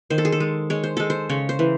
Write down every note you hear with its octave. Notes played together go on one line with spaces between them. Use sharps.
D#3 C5
A4
G#4
A4
G#3
G#3 C#5
C5
G#3 A4
C5
C#3 C#5
C5
E3